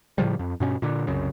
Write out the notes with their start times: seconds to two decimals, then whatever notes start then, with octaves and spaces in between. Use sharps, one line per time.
0.18 A2 C#3 F3 G3
0.39 F2
0.60 G2 B2 C4 C#4
0.82 A#2 D3
1.07 C2 F#2 C#3